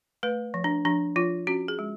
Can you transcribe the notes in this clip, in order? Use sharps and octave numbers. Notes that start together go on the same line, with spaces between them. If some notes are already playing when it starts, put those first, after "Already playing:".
A3 B4
F3
D4
F3 D4
F3 F4
C#4 F#4
G#4
G#3